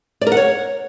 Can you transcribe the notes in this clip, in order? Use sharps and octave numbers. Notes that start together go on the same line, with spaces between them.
D5
A#4
F#5
C#5